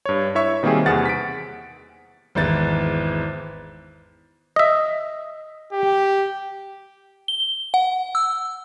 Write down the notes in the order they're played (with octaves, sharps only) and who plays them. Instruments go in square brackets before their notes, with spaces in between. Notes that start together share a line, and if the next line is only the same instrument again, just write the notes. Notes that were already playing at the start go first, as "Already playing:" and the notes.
[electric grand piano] G2 C#5
E4 C#5 E5 C#6
B2 D#3 G3 A#3 C4 G#4
E2 C3 G#4 F#5 F6 A6
B6 D7
[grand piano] G#1 E2 E3 A6
[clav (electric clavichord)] D#5 E5
[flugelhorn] G4
[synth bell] G7
F#5
E6